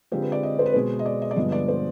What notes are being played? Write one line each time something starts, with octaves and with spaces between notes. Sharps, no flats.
D3 G#3 C4 F4 G4
B4
D5
D#5
C5
B4
B2 G#3 B3 C5
D#5
D5
D#5
D5
G2 D3 F3 G#3 B3 D#5
D5
C5